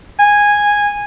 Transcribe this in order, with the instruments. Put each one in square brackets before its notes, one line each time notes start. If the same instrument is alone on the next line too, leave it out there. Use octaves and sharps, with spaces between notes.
[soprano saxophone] G#5